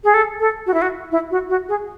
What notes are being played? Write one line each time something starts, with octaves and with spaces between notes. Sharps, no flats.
G#4
A4
A4
F#4
E4
F#4
E4
F#4
F#4
G#4